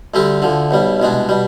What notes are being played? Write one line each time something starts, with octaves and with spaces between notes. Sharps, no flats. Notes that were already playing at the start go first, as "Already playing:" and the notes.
D2 D3 G3 C4 G4
D2 D3 F3
B1 B2 G3
C2 B2 G#3 D4
B2 G3